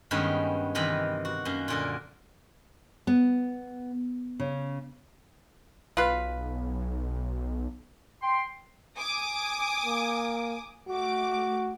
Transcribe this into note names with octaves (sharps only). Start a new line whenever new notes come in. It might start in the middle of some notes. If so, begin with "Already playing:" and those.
G2 D#3 G#3 B3 C#4
C3 D#3 E3 D#5 B5
F#4
F#2 A#3
A#2 D3 A#4
B3
C#3
B1 F4 B4
G5 C6
G#5 D6 D#6
A#3
A3 F#4 D6